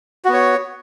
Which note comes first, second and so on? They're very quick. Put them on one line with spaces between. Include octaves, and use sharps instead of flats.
F#4 B3 C#5